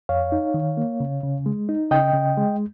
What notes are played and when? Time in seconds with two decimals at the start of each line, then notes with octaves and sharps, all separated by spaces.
0.09 F2 C#5 F5
0.32 D#4
0.54 D#3
0.77 A#3
1.00 C#3
1.23 C#3
1.46 G#3
1.69 D#4
1.91 C#3 D#5 G5
2.14 C#3
2.37 G#3